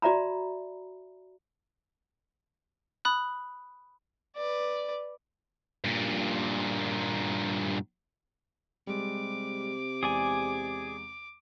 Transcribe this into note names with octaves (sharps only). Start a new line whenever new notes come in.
F#4 D5 E5 A#5 B5
B5 D#6 F#6
B4 D5
G2 A#2
C3 G3 G#3 D6
E2 G#3 G#4 D5 G#5